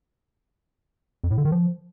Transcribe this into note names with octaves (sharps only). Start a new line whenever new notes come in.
F2
A2
D3
D#3
F3